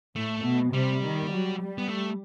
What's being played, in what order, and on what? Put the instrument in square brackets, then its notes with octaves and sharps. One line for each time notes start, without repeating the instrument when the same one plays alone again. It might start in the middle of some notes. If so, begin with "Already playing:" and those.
[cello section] A2 [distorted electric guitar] A3
[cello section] B2
[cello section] C3 [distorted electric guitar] G3
[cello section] D#3
F#3
G3
[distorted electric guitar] B3
A3